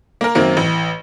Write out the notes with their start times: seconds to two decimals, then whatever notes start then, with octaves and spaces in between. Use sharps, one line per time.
0.21 A#3 A#4
0.35 F#2 D#3 F#3 A#3 C4
0.57 A1